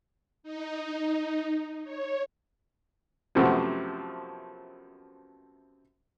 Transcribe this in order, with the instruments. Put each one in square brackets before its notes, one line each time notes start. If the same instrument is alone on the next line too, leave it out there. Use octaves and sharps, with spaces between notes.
[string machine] D#4
C#5
[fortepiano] F#2 C3 F3 A3 B3